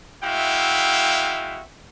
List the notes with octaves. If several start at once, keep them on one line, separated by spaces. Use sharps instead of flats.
G#3 E4 F#4 E5 F5 G5